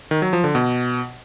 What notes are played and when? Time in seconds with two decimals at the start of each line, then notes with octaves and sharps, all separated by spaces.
0.11 D#3
0.22 F#3
0.33 F3
0.44 D3
0.55 B2